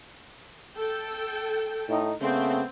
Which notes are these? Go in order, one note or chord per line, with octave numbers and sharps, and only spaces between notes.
A4 G5
A2 D#4
C#3 A3 B3 C4